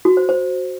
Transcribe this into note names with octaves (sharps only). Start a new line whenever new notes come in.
F#4
C5
C5